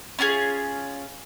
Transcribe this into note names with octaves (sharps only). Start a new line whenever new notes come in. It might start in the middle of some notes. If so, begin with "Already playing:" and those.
C#4 F4 G4 G#4